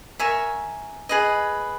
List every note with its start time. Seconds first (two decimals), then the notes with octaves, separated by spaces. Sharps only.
0.19 A#4 E5 G#5 C#6
1.09 G#4 B4 D#5